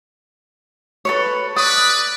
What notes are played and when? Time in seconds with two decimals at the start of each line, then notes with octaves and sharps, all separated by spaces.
1.05 A4 B4 C#5
1.56 B4 D5 D#6